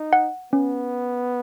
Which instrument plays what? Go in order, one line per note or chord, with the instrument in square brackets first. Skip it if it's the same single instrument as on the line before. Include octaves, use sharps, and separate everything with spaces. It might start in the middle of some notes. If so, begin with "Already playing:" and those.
Already playing: [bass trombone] D#4
[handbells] F#5
[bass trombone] B3 [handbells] C#4